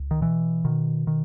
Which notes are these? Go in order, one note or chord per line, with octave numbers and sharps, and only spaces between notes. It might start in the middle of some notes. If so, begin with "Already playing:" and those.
Already playing: C#2
D#3
B2 E3
B2 D#3
D#3